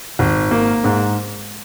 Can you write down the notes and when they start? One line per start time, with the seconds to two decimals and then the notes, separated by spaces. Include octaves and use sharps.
0.19 G#1
0.51 A#3
0.84 G#2